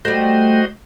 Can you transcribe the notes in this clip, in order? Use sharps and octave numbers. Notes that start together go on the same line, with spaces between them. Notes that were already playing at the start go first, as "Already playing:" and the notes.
G3 A3 F#4 C5 D#5